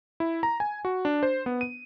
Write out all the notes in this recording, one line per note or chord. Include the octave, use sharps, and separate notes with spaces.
E4
A#5
G#5
F#4
D4
C5
B3
D#7